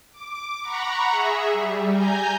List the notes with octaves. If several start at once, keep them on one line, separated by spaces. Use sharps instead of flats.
D6
F#5 A#5 B5 C#6
G#4 E5
G3
G#5 A#5 G6